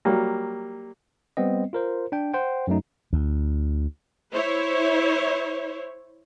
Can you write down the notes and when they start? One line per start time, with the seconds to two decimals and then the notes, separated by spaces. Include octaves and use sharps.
0.05 F#3 G3 A#3
1.37 G3 B3 C4 D#5
1.73 F4 A#4 C5
2.12 D4 G5
2.34 C5 F#5 G5
2.67 F#2 F#3 A3 D#4
3.13 D2
4.32 E4 C5 C#5